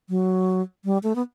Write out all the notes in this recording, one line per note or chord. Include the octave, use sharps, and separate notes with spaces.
F#3
G3
A3
B3